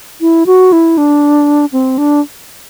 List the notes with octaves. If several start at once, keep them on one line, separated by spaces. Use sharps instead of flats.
E4
F#4
E4
D4
C4
D4